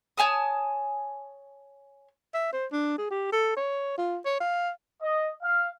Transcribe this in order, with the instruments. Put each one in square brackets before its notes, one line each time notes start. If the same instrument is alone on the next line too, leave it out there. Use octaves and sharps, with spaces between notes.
[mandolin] C#5 G#5 A5 D#6
[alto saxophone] E5
C5
D4
G#4
G4
A4
C#5
F4
C#5
F5
[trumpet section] D#5
F5